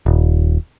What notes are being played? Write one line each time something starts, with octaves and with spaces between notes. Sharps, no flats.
D#1